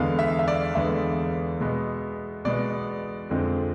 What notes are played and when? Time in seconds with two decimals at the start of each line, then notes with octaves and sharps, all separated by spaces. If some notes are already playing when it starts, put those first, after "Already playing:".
Already playing: E2 D3 G#3 B3 F5
0.19 E5
0.39 E5
0.48 D5
0.75 E2 D3 G#3 B3 E5
1.60 B2 G#3 B3
2.45 B2 G#3 B3 D5
3.30 F2 D3 F3 G#3 C4